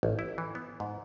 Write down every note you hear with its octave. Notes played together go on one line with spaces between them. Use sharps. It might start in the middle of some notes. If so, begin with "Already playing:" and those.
A1
E4
E3
B3
G#2